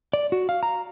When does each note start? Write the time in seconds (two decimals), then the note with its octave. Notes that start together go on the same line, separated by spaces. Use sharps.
0.13 D5
0.32 F#4
0.49 F5
0.63 A#5